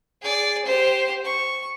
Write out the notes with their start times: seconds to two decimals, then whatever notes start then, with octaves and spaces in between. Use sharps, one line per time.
0.22 G#4 D5
0.65 G4 C5
1.24 C#6